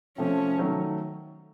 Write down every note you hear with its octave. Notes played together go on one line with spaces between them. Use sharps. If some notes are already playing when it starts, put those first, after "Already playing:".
C3 F3 A3 C#4
D#3 F#3 A3